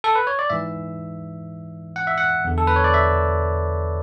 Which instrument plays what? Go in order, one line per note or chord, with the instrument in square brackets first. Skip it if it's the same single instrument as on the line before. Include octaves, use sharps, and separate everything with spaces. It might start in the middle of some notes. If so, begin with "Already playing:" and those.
[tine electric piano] A4
B4
C#5
D5
G#2 E3 E5
F#5
E5
F#5
E2 D3
A4
B4
C#5
D5
E5